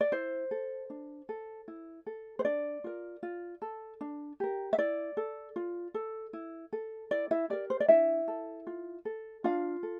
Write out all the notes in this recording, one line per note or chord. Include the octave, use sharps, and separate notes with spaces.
D5
E4 C5
A4
D4
A4
E4
A4
C5
D4 D5
F4 A#4
F4
A4
D4
G4 A#4
E5
E4 D5
A4
F4
A4
E4
A4
E4 D5
E4 E5
G4 A#4 D5
C5
D5
D4 E4 E5
A4
F4
A4
D4 F4 F5
A4